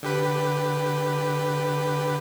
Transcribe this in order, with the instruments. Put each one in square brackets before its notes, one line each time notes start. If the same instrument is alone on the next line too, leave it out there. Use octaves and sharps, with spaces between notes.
[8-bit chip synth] D3 G4 B4